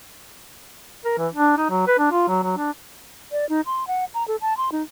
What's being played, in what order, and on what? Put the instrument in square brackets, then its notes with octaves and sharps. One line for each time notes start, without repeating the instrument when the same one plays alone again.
[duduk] A#4
E3
D4
D#4
F#3
B4
D4
F4
F#3
F#3
D4
[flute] D5
D#4
C6
F#5
A#5
A4
A5
C6
D#4